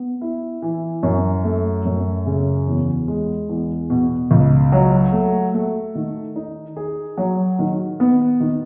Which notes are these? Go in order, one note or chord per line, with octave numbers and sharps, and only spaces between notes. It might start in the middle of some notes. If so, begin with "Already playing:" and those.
Already playing: B3
E4
E3
F#2
A3
F#2
C#3
E2
G#3
E2
B2
C#2
F#3
A3
A3
D#3
D#4
G#4
F#3
D#3
B3
D#3